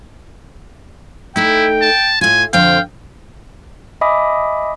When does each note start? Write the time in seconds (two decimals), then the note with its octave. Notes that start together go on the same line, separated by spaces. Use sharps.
1.36 A3 D#4 E4 G5
1.81 A5
2.21 A2 F4 G#5
2.53 F2 D3 C4 F5 G5
4.01 D#5 E5 G#5 B5 D6 D#6